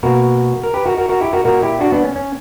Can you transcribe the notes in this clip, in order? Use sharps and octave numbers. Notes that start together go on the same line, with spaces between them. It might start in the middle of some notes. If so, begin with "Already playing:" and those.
B2 A#3 F#4 A#4
A#4
G4 B4
F#4 A#4
F#4 A#4
F#4 A#4
E4 G4
F#4 A#4
A#2 A#3 F#4 A#4
E4 G4
D4 F#4
B3 D4
C#4
C#4